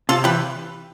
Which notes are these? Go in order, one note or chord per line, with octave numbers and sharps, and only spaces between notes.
C3 F4 A4
E3 G4 B4